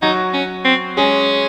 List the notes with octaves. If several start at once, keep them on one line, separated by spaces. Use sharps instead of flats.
F#3 D#4 F#4
C#4
C4
G#3 C#4 G#4